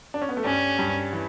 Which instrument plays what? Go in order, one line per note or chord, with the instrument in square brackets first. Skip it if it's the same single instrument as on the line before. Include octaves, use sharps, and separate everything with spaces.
[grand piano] D4
C#4
B3
A3
[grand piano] G2 G3 [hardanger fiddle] C#4
[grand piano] G2 G3
E3